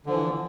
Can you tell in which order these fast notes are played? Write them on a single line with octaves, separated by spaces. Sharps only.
D3 F3 E3